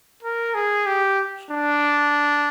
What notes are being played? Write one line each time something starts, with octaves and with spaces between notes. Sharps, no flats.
A#4
G#4
G4
D4